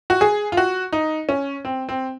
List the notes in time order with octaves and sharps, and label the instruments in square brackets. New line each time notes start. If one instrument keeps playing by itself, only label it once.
[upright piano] F#4
G#4
F4
F#4
D#4
C#4
C4
C4